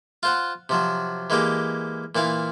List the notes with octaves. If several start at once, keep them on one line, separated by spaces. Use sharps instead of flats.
F4 C5 F#5
C3 F3 F#3
E3 G#3 A#3 G4
A#2 E3 E4 F5